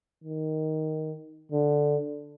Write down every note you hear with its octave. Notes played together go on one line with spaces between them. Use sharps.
D#3
D3